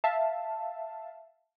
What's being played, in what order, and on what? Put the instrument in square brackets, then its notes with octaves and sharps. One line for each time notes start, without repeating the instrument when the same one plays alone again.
[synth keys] E5 F5 A5